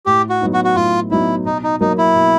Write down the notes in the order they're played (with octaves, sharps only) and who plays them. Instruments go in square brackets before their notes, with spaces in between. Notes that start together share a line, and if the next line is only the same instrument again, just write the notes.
[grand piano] A2 [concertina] G4
[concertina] F#4
[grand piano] F#3 B3 D#4
[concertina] F#4
F#4
[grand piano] A2 [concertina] F4
[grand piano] F#3 B3 D#4 [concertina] E4
[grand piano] B2 [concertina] D#4
[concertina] D#4
[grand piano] F#3 A#3 [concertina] D#4
[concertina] E4
[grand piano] B2